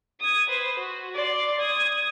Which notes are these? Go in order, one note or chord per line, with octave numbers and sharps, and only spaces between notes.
D#6 G#6
B4 C5
F#4
D5 C6
D#6 G#6